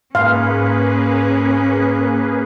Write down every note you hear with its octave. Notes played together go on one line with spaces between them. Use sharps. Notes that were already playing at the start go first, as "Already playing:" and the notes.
G#2 A#3 C#4 G#4 B4 F5 C6